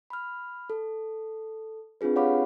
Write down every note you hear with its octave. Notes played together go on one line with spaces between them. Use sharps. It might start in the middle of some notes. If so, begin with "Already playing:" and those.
B5 F6
A4
C4 D4 F4 G#4 B4
G4 C#5 F5 F#5 B5 D6